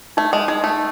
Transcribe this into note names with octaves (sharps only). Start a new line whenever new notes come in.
A3 D#4
G#3
G#3 D#4
A3